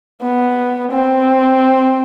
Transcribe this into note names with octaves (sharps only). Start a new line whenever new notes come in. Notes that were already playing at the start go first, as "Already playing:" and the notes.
B3
C4